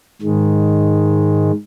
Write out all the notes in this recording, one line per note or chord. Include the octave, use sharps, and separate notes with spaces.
G#2 D#3 G#3